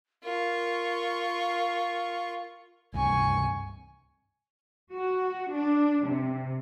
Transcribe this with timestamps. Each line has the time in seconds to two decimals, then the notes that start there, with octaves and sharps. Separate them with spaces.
0.25 F4 A#4 C#6
2.94 C#2 G2 C3 G#5 C#6
4.93 F#4
5.53 D4
6.05 C3